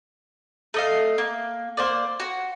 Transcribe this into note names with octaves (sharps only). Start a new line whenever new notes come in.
A3 D#5 F5
A#3
A#3 C5 D5
F#4